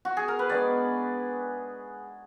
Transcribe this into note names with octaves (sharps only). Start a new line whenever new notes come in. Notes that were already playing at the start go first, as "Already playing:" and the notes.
F#4
G#4
A#4
B4
D#3 G#3 B3 D4 D5